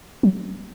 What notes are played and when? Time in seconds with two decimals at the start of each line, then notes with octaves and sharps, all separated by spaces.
0.23 F#3